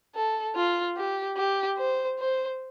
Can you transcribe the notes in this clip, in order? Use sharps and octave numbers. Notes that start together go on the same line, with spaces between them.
A4
F4
G4
G4
C5
C5